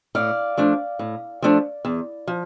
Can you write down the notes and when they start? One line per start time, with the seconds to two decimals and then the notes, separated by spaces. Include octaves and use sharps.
0.15 A2 D5 F5
0.57 F3 A3 D4
0.99 A2
1.42 F3 A3 D4
1.85 E2
2.27 F3